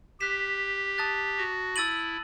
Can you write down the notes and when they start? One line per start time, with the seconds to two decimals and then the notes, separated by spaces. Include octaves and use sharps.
0.20 G4 F#6 B6 E7
0.98 A5 D#6 F#6 A6
1.37 F#4
1.76 E4 E6 A6 D#7 F#7